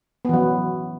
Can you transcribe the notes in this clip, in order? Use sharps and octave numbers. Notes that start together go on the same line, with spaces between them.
E3 F#3 B3